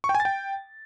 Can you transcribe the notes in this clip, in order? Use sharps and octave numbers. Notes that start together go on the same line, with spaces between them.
C#6
G5
G#5
A6
G5